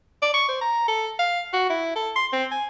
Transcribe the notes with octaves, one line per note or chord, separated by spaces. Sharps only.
D5
C#6
C5
A#5
A4
F5
F#4
E4
A4
C6
C4
G#5